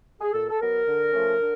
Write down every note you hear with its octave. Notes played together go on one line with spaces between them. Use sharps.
G#4
A#2 A4
A4
F#3 B3 A#4
D3
F3 A3 C#4
D3